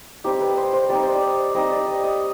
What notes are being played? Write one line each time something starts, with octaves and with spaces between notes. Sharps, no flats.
G3 C4 D#4 G4
B4
C5
C5
G3 C4 D#4 D5
C5
D5
G3 C4 D#4 D#5
D5
D#5
D#5